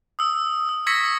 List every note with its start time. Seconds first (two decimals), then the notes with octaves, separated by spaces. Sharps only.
0.19 D#6 E6
0.69 E6
0.87 C#6 E6 G#6 A#6 B6 C#7